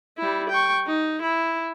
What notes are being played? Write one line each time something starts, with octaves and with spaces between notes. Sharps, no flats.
G3 E4
G5 C#6
D#4
E4